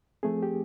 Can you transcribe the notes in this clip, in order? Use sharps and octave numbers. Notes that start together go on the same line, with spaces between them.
F3 A3 C4 G#4
G4